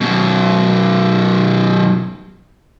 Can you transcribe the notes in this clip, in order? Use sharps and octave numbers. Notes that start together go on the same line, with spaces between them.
F#2 B2